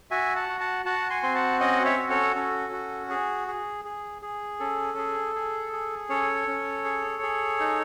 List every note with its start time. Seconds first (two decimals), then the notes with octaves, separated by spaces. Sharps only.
0.11 F#4 E5 G#5
0.36 F#5 A5
0.49 F#4
0.60 F#5 A5
0.86 F#4 F#5 A5
1.10 G#5 C6
1.23 C4 C6
1.35 F#5 A5
1.60 C#4 D#5 F#5
1.85 C#5 E5
1.98 F#4
2.10 A4 C#5
2.35 C#4 A4
2.73 F#4
3.10 G#4
3.48 G#4
3.85 G#4
4.22 G#4
4.60 C#4 A4
4.98 G#4
5.35 G#4
5.73 G#4
6.09 C#4 A4 C#5
6.48 C#4
6.84 G#4
7.23 G#4
7.60 D#4